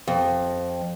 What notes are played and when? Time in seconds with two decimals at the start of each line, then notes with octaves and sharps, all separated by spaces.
0.08 F2